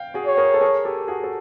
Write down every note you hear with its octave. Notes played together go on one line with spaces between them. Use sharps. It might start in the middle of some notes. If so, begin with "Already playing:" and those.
Already playing: F5 G5
F#4 G#4
C#5
G#4 A#4
A4
G#4 A#4
G4 A4
F#4 G#4
A4